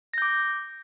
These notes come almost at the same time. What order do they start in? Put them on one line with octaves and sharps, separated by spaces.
A#6 G6 D6